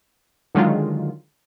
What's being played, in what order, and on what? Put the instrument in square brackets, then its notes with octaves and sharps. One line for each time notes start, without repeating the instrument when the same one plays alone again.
[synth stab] D3 D#3 F#3 G#3 F4